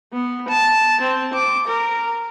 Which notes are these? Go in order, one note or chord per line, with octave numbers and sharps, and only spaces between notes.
B3
A5
C4
D6
A#4